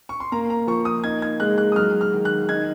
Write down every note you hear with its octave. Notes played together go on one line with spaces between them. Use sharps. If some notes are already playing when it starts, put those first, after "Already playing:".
C#6
C6
A#3 A#5
A#5
F3 C#6
D#6
D#4 G#6
G#6
G#3 F#6
F#6
D#6
F#3 F6
F6
D#3
F#6
D#4 G#6